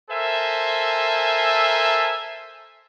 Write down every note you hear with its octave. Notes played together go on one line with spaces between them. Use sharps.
A4 A#4 C5 E5 G#5